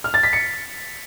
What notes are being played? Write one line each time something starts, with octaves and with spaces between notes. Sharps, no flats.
F6
A6
B6
C#7